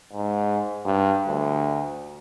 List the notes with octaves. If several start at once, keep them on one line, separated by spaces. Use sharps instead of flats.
G#2
G2
D2